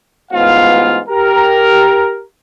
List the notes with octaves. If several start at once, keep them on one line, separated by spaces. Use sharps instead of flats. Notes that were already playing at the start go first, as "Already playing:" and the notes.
A1 G#2 B3 F4 F5
G4 A#4